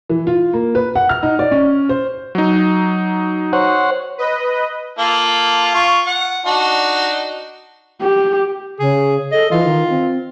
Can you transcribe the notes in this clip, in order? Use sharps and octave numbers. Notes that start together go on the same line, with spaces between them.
E3
F4
A#3
B4
F#5
F6
D#4
D5
C#4
C5
F#3 D#4
C5 C#5 F#5
B4 D#5
A#3 F4 A4
F4 C#6
F#5
D4 D#4 F#4
G4
C#3 G#4
A4 D#5
E3 F4
D#3
C4